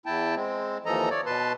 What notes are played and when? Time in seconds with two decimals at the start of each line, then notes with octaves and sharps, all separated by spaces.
0.06 E2 E4 G5 A5
0.36 G#3 C4
0.86 D#2 E3 F3 A4 D#5 A#5
1.10 C#5 D5
1.26 B2 B4 A5 C6